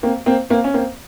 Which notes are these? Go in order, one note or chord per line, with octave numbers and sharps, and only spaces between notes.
A#3 C4
A#3 C4
A#3 C4
C#4
A#3 C4